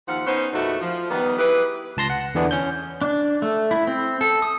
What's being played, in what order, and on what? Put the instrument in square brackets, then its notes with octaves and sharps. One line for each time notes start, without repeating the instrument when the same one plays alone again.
[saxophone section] D#2 F3 F5 F#5
B3 C#4 D#4 C5
E2 A#2 A3 D#4 F#4
F3
D#3 G3 B3
E4 G4 G#4 B4
[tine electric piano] C#2 A5 C6 A#6
F#5
E2 D3 E3 B3 D4
C#4 G6
[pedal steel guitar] D4
A3
E4
C4
A4
D#6